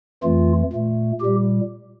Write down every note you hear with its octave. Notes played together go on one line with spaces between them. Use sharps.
F2 E3 A3 F4
A#2 A3
A#2 G3 G4